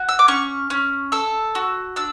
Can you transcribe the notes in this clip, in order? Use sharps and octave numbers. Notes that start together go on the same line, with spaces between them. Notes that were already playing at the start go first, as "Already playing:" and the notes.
Already playing: F#4
E6
D6
C#4 C#6
C#4
A4 E6
F#4
D4 E6